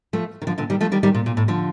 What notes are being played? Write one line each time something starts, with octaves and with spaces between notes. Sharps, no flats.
F3 A3
D#3
D3 F3
A#2 D3
D#3 G3
F3 A3
D#3 G3
D#3 G3
A#2
A#2
A2
D3 F3